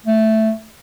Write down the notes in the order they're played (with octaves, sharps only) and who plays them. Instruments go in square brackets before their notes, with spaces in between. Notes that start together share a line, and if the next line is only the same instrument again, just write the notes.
[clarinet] A3